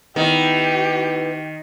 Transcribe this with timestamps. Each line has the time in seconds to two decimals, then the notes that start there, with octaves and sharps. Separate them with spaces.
0.16 D#3 B3 E4 G4